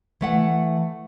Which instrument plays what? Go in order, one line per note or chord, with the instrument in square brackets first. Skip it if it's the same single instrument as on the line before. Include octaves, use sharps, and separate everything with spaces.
[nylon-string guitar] E3 A3 F#5